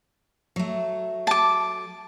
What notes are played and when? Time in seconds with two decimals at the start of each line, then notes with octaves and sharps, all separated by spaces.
0.56 F#3 A3
1.27 A5 D6